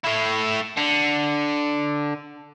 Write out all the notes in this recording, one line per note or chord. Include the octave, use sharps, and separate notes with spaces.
A3 E4
D3